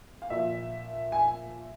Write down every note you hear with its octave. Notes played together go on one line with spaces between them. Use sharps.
F5
A#2 F3 E5
G#5